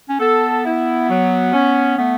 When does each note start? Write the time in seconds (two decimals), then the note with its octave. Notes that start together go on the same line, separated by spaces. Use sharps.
0.09 C#4
0.20 B3 A4
0.65 E4
1.09 F#3
1.53 C#4
1.98 A3 B3